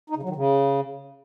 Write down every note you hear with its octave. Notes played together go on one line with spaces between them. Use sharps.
D#4
C#3
F#3
D#3
C#3